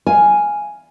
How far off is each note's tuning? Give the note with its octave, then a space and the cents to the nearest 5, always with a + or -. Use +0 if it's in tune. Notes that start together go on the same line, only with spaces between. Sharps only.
F5 +0 G#5 +0